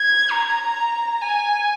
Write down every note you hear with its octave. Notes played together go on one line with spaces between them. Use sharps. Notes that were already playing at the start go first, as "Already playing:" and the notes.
Already playing: G#6
A#5
G#5